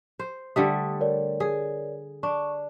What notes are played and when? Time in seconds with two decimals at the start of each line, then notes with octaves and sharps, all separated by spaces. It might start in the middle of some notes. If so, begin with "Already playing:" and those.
0.19 C5
0.56 D3 G3 A3 D#6
1.00 A#4 C#5 D5
1.40 G#4
2.23 D4 C#6